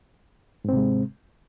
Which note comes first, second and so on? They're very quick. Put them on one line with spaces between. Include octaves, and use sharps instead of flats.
G#2 C4 C3 G#3